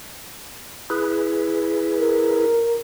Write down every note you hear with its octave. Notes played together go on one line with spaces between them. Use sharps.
E4 G#4 B4
A#4